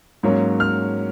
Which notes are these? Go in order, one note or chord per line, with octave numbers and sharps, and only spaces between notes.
G#2 F#3 A#3 C#4
F6